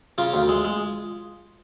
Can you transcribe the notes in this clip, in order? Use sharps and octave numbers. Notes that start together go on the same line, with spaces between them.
C#3 F4
D2
G#3
G#3